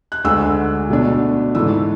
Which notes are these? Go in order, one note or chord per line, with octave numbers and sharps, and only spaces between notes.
F#6
D2 D3 G#3 E6
B2 A3 D4
G#2 E3 A3 E6